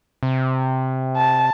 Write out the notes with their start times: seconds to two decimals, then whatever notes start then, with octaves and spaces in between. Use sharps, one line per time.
0.23 C3
1.16 A5